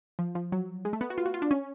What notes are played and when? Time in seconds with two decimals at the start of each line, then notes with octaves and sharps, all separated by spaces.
0.19 F3
0.35 F3
0.52 F#3
0.85 G#3
0.93 A3
1.01 B3
1.10 F#4
1.18 F4
1.26 F#4
1.34 F4
1.42 D4
1.51 C#4